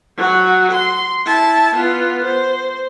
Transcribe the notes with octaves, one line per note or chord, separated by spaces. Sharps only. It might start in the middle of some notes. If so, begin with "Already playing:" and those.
F#3 F#4
C6
E4 A5
B3 F4
C5